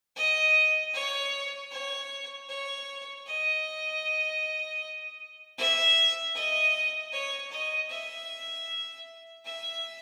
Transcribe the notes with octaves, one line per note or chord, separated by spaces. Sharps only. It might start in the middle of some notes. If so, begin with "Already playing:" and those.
D#5
C#5
C#5
C#5
D#5
E5
D#5
C#5
D#5
E5
E5